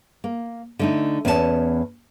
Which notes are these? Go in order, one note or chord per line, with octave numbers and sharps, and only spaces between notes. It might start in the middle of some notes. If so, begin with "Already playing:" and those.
A#3
D3 A3 D#4
E2 B3 C#4 A#4 A5